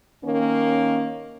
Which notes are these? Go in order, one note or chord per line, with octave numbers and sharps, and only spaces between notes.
D#3 A#3 C#4